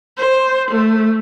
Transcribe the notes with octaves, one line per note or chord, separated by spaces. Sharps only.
C5
A3